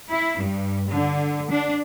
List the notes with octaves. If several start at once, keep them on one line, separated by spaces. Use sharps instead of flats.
E4
G2
D3
D4